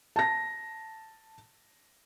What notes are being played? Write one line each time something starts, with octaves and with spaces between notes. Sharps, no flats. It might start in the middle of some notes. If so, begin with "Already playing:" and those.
A5 A#6